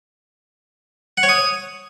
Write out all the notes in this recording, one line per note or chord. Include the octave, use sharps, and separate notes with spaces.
F#5
C#5
D#6